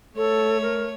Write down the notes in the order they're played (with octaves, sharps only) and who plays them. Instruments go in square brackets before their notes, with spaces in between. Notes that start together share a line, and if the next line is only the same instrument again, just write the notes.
[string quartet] A3 C#5 [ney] A4
[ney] A#4